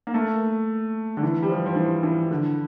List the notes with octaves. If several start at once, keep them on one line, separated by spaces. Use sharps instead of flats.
A#3
A3
D3
E3
G3
F3
F3
E3
E3
D3